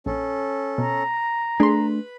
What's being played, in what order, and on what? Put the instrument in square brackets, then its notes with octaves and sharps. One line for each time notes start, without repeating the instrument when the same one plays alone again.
[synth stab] A#1 [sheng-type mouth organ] C#4 A4
[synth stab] B2 [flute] A#5
[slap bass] A3 D4 [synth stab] G#4 C6 [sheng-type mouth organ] B4 B5